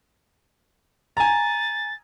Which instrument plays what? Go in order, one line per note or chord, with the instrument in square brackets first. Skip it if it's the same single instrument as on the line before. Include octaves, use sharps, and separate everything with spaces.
[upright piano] G#5 A#5 [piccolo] A6